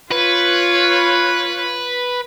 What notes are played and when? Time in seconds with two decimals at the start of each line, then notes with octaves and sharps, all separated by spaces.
0.11 F4 B4 C#5